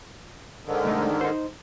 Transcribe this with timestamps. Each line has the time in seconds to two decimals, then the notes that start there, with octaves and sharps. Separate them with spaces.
0.65 G#2 D3 D#3
0.85 C2 A3 D#4
1.21 D#4 C5